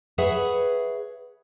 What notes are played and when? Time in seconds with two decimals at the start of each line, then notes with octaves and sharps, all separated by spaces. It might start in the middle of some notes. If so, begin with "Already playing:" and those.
0.18 G#4 B4 C#5 E5 F#5